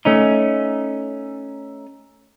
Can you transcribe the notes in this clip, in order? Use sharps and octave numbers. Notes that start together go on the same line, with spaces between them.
A3 C#4 D#4